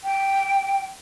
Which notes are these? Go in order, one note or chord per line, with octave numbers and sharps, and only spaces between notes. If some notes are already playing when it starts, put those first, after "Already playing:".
G5